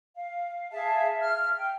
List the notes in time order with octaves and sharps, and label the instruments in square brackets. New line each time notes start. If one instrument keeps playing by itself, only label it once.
[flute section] F5
G#4 E5 F5 A5
F6
G5